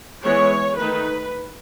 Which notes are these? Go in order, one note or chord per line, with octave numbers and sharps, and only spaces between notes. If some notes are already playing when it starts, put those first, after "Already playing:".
E3 G#3 B3 C#5
D#3 A3 D#4 B4